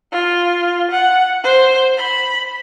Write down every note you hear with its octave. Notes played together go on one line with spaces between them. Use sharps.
F4
F#5
C5
B5